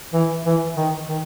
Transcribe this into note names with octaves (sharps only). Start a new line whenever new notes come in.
E3
E3
D#3
D#3